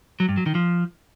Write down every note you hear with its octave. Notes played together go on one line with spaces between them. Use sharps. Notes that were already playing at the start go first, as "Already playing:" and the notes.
F#3
G2
F#3
D#3
F3